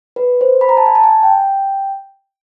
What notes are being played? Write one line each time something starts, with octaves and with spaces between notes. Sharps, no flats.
B4
C5
B5
A#5
A5
G#5
A5
G#5
G5